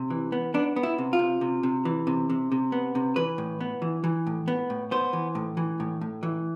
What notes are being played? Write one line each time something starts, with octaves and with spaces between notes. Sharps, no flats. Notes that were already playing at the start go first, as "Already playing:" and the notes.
Already playing: C3
E3
B3
B3 D4
B3
E4
C3
F4
C3
C3
C3
E3
C3
C3
C3
B3
C3
E3 B4
A2
B3
E3
E3
A2
B3
A2
B3 C5
E3
A2
E3
A2
A2
E3